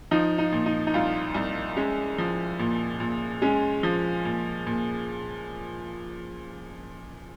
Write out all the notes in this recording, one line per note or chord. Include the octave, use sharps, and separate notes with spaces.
F3 D#4
D#4
A#2
D#4
D#4
C2 F4
C2
G#3 C#4
F3
A#2
A#2
G#3 C#4
F3
A#2
A#2